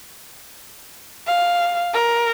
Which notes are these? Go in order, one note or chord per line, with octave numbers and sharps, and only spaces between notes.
F5
A#4